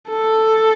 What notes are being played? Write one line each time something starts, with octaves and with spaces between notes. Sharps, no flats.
A4